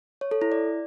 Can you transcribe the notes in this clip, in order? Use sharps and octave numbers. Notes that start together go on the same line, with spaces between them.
C#5
A4
E4
D5